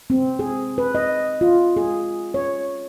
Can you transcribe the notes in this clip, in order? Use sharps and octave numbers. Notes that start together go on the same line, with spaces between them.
C4
G#4
B4
D#5
F4
G#4
C#5